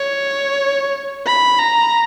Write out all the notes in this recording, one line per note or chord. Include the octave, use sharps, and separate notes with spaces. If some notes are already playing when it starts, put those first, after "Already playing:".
Already playing: C#5
B5
A#5